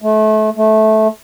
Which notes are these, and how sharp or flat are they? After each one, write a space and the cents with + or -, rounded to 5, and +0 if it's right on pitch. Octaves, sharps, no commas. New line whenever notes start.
A3 -30
A3 -15